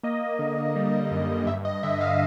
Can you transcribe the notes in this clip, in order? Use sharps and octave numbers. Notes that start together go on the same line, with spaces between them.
A#3 D#5
D3
G3
F#2
G2 E5
D#5
D3 E5
F5